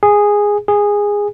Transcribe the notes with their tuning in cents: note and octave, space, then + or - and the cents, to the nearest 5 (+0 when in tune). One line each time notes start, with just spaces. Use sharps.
G#4 -10
G#4 -15